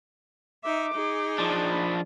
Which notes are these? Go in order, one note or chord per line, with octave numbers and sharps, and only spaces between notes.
D#4 E5 D6
D#4 G#4
F3 D4
B5